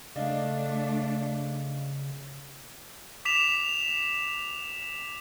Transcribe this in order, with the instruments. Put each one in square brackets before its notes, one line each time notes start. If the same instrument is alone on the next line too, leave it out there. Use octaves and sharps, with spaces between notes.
[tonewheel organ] C#3 [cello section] A3 D4 [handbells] D5 D#5 F5
[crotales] D6 B6 E7 F7